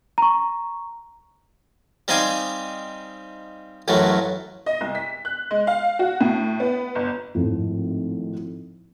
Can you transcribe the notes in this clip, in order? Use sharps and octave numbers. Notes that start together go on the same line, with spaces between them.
A#5 C#6
G3 C4 D#4 F5 G#5 D6
A1 F#2 A2 F#3 A3
D#5
C2
B6
F#6
G#3
F5
F#4
A2
B3
G1
G#1 A2 F3